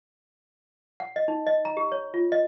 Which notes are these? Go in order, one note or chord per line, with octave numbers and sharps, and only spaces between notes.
F#5
D#5
D#4
D#5
A#5
G4
C#5
F4
D#5